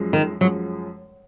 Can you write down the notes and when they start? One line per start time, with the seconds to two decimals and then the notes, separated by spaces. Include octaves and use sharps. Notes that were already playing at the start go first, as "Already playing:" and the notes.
Already playing: F#2 F3 G#3
0.13 D#3
0.41 F#2 F3 F#3 G#3